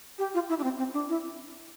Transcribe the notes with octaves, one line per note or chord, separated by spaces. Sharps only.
G4
F4
E4
D4
C4
C4
D4
E4